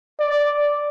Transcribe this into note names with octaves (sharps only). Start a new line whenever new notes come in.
D5